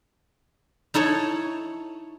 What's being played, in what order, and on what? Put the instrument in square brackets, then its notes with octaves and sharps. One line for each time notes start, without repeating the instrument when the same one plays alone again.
[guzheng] D#4 E4 A4 C#5